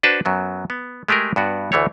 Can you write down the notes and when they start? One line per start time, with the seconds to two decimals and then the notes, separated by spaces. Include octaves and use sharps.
0.03 D4 F#4 B4 C5 A5
0.25 F#2 F#3 B3
0.70 B3
1.08 G#3 A3 G4 G#4 A#4
1.36 G2 B3 F#4 D5
1.72 D2 E3 A3 C#5